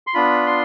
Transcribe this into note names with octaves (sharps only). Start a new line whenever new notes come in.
C6
B3 D4 F4 B5
C6